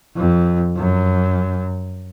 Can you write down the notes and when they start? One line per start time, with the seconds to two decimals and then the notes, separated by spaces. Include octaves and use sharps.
0.16 F2
0.76 F#2